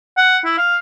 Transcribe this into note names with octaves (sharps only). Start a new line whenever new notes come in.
F#5
E4
F5